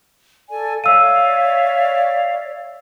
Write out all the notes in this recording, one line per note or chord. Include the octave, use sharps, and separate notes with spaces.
A4 D5 G#5
C#5 D5 E5 F5 E6 D#7